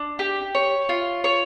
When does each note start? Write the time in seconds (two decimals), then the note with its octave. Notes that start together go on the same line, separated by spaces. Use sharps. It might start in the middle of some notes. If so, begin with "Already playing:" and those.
Already playing: D4
0.19 G4
0.54 C#5
0.89 F4
1.24 C#5